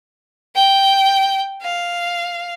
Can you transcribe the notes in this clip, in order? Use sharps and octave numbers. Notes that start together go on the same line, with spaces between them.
G5
F5